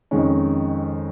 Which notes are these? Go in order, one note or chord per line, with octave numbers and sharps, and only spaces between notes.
F2 D#3 G#3 C#4